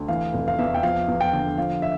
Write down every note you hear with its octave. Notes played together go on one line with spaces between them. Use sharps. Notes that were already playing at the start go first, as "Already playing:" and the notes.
Already playing: D2
E3 F5
F1
F5
E2 E5
G5
F3 F5
E2
G5
D3
F3 F5
E5